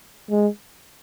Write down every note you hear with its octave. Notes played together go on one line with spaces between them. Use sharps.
G#3